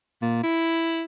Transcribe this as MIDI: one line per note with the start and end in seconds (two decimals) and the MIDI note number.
0.22 0.40 46
0.43 1.04 64